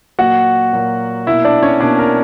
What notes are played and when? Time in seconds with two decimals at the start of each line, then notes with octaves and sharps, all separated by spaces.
0.19 A#2 F#3 A#3 F#4 F#5
0.73 A#2 F#3 A#3
1.27 B2 A#3 E4 E5
1.45 D4 D5
1.62 C#4 C#5
1.80 B2 A#3 D4 D5
1.99 A#4